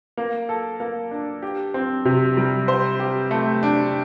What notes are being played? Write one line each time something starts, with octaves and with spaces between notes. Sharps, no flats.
A#3
A4
A#3
D4
G4
C4
C3
G3
C5
G4
A3
D4